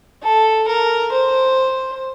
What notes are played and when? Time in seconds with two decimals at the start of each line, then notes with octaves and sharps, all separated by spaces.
0.23 A4
0.68 A#4
1.12 C5